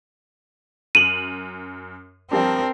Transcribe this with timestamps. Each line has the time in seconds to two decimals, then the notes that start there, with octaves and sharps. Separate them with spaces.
0.95 F#2 D#7 F7 F#7
2.31 F3 G3 C4 D4 A#4